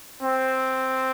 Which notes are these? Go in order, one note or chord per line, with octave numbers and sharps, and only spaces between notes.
C4